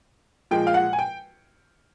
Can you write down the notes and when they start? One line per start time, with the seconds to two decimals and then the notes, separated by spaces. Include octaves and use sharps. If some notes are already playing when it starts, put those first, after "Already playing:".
0.51 A#2 F3 G#3 G5
0.67 F5
0.74 F#5
0.93 G#5
0.99 G5